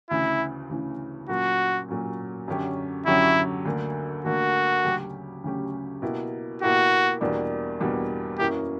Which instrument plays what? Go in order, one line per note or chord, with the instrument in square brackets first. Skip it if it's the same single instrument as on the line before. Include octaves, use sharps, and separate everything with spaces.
[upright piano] D2 C#3 E3 [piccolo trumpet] E4
[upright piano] D2 C#3 E3
[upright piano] A#2 F#3 C#4 [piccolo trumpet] F#4
[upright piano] A#2 F#3 C#4
F#2 D3 F#3 C#4 G4
[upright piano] F#2 D3 F#3 C#4 G4 [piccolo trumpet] E4
[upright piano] D2 D3 A#3
[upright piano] D2 D3 A#3 [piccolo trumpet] F#4
[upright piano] D2 C#3 F#3 C#4 G4
D2 C#3 F#3 C#4 G4
B2 A#3 E4 G4
[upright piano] B2 A#3 E4 G4 [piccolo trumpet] F#4
[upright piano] E2 B2 G3 A#3 D4
E2 B2 G3 A#3 D4
[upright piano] F#2 E3 A#3 C#4 F#4 [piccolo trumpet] G4